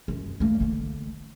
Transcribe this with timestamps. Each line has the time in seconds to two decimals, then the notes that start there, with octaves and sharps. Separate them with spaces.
0.08 F#2
0.40 A3 A#3
0.60 D3 E3